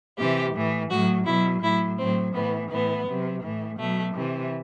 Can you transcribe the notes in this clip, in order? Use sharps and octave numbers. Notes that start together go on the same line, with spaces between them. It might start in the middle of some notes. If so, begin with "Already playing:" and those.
C3 E3 G4
A2 E3
A2 F#3 F#4
B2 F#3 E4
A2 F#3 E4
A2 F#3 C4
A2 E3 B3
A2 E3 B3
C3 F#3
A2 E3
B2 F#3 A3
C3 E3